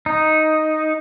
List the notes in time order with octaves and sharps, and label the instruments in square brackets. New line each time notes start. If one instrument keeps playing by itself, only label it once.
[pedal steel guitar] D#4